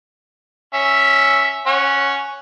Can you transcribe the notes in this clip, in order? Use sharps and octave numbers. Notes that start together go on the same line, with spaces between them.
C#4 E5
C#4 C#5 F#5